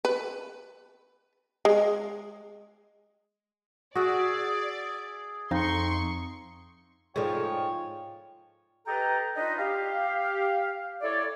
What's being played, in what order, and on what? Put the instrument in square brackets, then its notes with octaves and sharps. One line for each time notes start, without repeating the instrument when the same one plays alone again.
[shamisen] B4
G#3
[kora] F#4 [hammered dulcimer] G#4 E5 [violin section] D5
[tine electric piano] F2 [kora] D#4 [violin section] C6 C#6
[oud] G#2 F3 [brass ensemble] F4 G5 [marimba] G#4 A4 D5 [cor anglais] C#5
[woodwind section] G4 A4 B4 D#5 G5 A#5
D4 D#4 F4 B4 D#5
G4 F5
E4 A4 C#5 D5